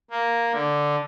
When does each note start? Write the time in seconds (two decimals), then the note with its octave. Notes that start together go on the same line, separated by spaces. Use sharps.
0.10 A#3
0.52 D3